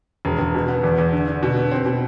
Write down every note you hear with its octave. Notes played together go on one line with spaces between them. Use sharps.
E1
E1
B2
B3
E2
E2
D3
D3
B2
B3
C4
B2